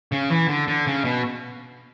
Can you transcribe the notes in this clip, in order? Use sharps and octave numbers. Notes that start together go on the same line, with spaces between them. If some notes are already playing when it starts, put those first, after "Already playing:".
C#3
E3
D3
D3
C#3
B2